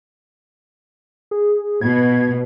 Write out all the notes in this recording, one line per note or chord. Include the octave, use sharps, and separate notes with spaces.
G#4
B2 G#6